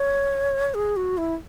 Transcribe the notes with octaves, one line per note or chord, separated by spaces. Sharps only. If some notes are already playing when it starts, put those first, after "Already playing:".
Already playing: C#5
G#4
F#4
E4